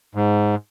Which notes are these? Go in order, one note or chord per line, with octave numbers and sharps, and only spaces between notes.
G#2